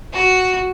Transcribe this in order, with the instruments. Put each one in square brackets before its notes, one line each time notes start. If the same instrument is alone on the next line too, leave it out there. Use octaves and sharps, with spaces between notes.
[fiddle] F#4